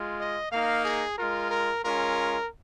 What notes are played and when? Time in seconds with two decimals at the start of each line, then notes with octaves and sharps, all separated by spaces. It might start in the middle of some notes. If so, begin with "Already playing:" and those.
Already playing: G#3 F4
0.19 D#5
0.52 A#3 D#4 F5
0.85 G#4
1.18 G#3 F4 A#4
1.51 A#4
1.84 G#3 C#4 F4 A#4